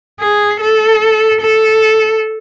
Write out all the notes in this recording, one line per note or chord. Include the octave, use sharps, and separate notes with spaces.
G#4
A4
A4